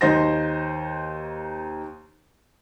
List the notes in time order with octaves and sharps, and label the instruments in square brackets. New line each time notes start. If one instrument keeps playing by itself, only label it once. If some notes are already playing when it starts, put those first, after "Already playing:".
[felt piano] D#2 D#4 C5 C6 A#6